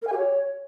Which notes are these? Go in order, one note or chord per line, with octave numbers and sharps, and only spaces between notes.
A#4
G#5
G4
C#5